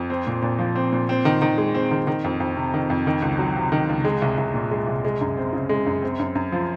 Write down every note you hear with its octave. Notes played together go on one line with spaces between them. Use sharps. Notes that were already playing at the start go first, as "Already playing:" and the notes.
Already playing: F2
C4
A#2
A#2
F3
C4
A#2
C4
D#3
D#3
G#3
C4
D#3
D#3
F2
F2
C3
D#3
F2
D#3
C#2
F#3
C3
D#3
C#2
G#3
C2
C2
A#2
G#3
C2
G#3
F#2
C4
C#3
G#3
F#2
C4
F#2
F#2
F3